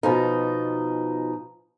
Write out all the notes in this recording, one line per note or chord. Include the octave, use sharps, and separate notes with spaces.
B2 F3 D#4